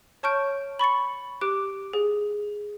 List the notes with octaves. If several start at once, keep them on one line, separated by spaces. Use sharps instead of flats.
C#5 A5 C#6 F6 G6 D7
B5 C#6 A6 C#7
G4 D6 F#6 D7
G#4